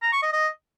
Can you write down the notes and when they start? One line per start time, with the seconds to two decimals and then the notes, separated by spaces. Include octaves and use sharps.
0.03 A#5
0.13 C#6
0.23 D#5
0.33 D#5